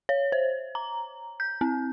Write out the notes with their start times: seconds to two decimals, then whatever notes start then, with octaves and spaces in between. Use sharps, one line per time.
0.09 C#5
0.32 C5
0.75 A#5
1.40 G6
1.61 C4